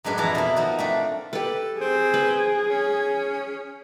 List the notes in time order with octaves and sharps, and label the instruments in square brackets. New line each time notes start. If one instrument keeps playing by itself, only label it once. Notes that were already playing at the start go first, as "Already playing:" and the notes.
[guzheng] F#2 A2 G#3 D4 B4
F2 E3 E4 E5 A5 A#5
B2 A#3 E4
F3 D#4 F#4
A3 C4 D4
[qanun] G4 B4 [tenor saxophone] A4
[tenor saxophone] C4 [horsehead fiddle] G#4
[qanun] B4
[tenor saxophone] C#4